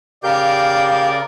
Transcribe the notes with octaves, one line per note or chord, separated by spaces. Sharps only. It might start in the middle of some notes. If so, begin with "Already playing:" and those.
C#3 G4 A#4 D5 F5 D6 G6